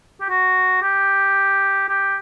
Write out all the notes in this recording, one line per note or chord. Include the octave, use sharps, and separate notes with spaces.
G4
F#4
G4
G4